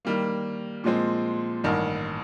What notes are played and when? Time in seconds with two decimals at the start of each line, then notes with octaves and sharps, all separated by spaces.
0.05 D#3 G3 A#3
0.84 A#2 F3 G#3 C4
1.64 A1 G2 D#3